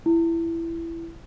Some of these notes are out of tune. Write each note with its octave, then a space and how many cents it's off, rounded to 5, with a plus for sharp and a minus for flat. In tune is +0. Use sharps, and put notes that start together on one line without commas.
E4 +15